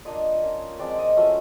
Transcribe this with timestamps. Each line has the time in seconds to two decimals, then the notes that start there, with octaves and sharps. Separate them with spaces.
0.05 A#3 D4 F4 D#5
0.42 A#3 C#4 F4
0.80 F3 G#3 C4 D5
0.98 D#5
1.16 F#3 A3 C#4 F4 E5